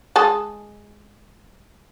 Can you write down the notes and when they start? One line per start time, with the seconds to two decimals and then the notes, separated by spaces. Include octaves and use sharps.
0.16 G#3 G#4 A5